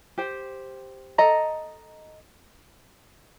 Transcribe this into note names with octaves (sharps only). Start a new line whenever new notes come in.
G4 C5 G5
A4 D#5 A#5